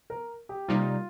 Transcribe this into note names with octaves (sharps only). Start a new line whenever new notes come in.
A#4
G4
C3 G3 A#3 D#4 F4